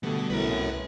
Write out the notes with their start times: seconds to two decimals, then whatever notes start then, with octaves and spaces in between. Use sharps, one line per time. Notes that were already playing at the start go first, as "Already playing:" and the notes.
0.03 B2 D3 G3 A3 B3
0.30 C2 F#2 A2 B4 A#5